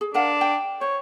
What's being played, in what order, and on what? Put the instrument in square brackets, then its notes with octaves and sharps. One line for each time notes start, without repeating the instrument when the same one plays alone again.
[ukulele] G#4
[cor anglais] D4 [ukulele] A#4 F5 F#5
[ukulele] G5
[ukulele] C5 [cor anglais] C#5